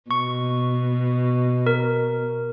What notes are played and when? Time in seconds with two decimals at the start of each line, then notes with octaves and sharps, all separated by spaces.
0.11 B2 C#6
1.66 A#4